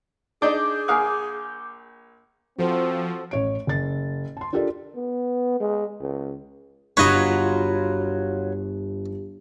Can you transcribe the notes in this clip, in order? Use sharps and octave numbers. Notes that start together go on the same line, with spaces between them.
D4 D#4 G#4 D5 D6 G6
A#1 F5 F#5 G#5 D#6 F#6
F3 C4 F#4 A4 C5
A1 C#5 D7
F#1 A6
A5 C6
D4 F4 G4 A4 A#4 D5
B3
G#3
C#2
G1 F#3 F4 G4 B4 C#5 D#5 G#6